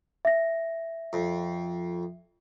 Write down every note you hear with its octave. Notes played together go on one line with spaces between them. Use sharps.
E5 A#6
F2